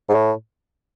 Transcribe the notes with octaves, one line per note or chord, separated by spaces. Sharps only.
G#2
A2